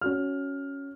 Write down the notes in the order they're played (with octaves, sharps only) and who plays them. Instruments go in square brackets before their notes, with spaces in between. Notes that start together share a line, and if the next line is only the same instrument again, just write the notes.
[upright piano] C#4 F#4 F6